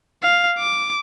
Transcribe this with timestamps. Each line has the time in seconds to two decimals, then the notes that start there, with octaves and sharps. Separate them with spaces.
0.23 F5
0.59 D6